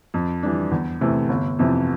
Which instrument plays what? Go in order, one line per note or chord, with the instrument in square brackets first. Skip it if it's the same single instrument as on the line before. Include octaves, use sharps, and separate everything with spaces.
[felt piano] F2
E3 G3 D4
E2
C3 E3 A3
G1
F2 C3 E3